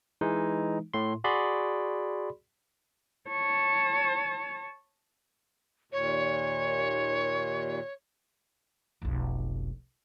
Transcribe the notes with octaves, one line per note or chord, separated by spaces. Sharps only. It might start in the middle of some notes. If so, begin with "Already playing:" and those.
E3 G#3 D#4
A2 C6
F#4 G#4 D5 B5 C6
C#5 A5
D#2 A#2 C#5
F1 B1